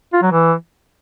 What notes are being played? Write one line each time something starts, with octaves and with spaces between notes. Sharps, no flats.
F4
F#3
E3